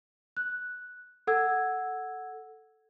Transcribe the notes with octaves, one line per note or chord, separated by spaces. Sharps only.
F#6
A4 F#5 E6 G#6